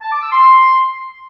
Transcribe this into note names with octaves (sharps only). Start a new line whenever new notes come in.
A5
D6
E6
C6